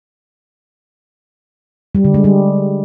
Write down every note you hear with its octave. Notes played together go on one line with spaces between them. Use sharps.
G3
D3
G#3
G3